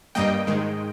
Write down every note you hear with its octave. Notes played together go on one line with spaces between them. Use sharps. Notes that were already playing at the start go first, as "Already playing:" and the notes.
G2 G3 A#3 D#5 G5
G#2 D#3 G#3